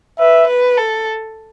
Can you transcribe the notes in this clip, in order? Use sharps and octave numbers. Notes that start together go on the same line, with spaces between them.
B4 E5
B4
A4